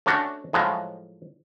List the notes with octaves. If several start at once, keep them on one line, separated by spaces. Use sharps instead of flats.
A3 C#4 D4 F#4
A2 F3 F#3 G#3